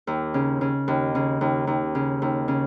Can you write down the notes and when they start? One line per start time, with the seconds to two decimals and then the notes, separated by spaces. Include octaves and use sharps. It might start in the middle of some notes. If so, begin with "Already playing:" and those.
0.07 D#2
0.34 C#3
0.61 C#3
0.88 D#2
1.15 C#3
1.41 D#2
1.67 D#2
1.95 C#3
2.22 D#2
2.48 C#3